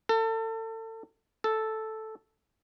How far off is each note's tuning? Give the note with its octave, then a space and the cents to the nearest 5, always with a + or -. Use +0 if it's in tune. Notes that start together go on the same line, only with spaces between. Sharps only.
A4 +30
A4 -5